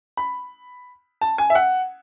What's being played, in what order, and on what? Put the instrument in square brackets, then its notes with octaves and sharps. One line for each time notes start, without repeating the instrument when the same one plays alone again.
[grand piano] B5
A5
G#5
E5
F#5